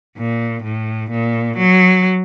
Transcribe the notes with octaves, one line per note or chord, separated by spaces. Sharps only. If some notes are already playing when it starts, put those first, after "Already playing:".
A#2
A2
A#2
F#3